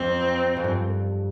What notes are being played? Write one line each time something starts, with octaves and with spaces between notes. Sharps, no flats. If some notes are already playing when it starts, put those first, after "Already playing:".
Already playing: F2 C4
F2
G2